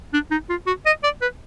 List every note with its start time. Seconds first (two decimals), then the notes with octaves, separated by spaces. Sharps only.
0.13 D4
0.31 D#4
0.50 F4
0.67 F#4
0.86 D#5
1.03 D5
1.22 B4